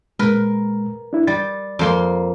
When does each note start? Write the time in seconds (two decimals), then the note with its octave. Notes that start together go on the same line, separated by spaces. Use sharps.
0.19 A#2 G#3 A#4 B4
1.13 D4 E4
1.27 G3 A6
1.79 F2 A#3 C6